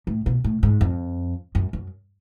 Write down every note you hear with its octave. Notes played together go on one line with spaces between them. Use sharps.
A2
B2
A2
G#2
F2
F#2
F#2